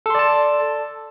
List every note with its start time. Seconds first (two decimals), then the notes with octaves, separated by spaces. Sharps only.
0.06 A4
0.10 C6
0.15 D5
0.19 A5